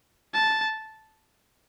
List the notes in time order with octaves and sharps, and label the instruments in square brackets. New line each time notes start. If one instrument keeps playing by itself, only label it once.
[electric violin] A5